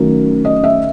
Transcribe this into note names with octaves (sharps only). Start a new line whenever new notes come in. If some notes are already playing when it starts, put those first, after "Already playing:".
Already playing: D#3 F#3 A3 C#4 A#4
D#5
E5